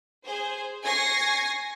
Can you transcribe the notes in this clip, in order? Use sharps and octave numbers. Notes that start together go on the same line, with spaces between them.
G#4 C5
G#5 C#6 A#6 C7